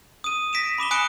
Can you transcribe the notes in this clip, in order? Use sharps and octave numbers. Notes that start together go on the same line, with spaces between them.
D#6 D#7
A#6 B6 D7 E7
B5 D6 E7 G7
G#5 D#6 F#6 C#7 D7 G7